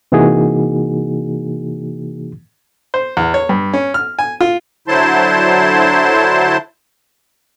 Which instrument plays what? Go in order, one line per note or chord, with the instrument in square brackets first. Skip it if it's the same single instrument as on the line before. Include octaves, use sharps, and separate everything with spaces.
[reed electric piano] C3 E3 A#3 D#4 F#4 G#4
[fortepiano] C5
E2
C#5
G2
C#4
F6
G#5
F4
[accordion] D3 F#3 E4 C5 A5 C6